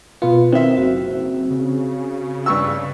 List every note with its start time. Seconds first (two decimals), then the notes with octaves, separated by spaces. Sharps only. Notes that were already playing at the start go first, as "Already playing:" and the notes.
0.22 B2 B3 F4
0.53 D#3 C4 E5
0.77 F#1 F#4
1.50 C#3
2.46 G2 C#6 E6